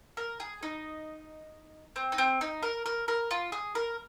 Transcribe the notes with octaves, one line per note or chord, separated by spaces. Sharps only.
A#4
G#4
D#4
C4
D#4
C4
D#4
A#4
A#4
A#4
F4
G#4
A#4